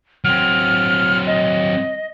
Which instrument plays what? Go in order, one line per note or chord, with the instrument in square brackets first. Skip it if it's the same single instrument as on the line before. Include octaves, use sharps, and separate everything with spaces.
[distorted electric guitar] F#3 C4 [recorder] F6
[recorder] D#5